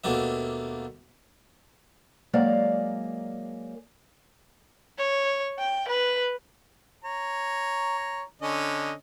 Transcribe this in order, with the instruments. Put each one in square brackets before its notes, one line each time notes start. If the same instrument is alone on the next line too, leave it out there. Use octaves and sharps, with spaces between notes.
[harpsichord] D#2 B2 A3 A#3 D4 E5
[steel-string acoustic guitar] F#3 G#3 A#3 D5 F5
[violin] C#5
G5
B4
[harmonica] C#5 A#5
D3 C#4 D#5